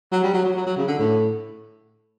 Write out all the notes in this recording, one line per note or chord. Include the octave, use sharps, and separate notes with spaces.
F#3
G3
F#3
F#3
F#3
F#3
C#3
D3
A2